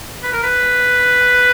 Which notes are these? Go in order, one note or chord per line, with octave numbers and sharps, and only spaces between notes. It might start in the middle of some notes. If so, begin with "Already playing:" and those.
B4
A#4
B4